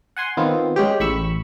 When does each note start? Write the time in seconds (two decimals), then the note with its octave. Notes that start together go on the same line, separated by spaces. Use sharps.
0.17 F#5 G#5 C6
0.37 D#3 B3 C4 F4
0.76 G#3 C#4 G4
1.00 A1 B5 C#6 E6